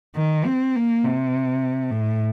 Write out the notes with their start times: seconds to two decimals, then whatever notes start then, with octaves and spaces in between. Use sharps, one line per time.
0.16 D#3
0.46 C4
0.75 A#3
1.04 C3
1.91 A2